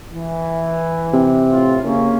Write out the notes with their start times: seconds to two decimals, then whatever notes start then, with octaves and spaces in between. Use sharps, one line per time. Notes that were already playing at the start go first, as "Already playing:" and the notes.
0.12 E3
1.13 C3
1.50 A2 F4
1.82 C#3 A#3 C#4